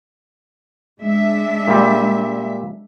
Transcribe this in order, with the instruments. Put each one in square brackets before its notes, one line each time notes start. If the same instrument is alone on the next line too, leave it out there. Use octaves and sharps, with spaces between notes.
[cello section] G#3 D4 E5
[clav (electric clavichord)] A#2 G3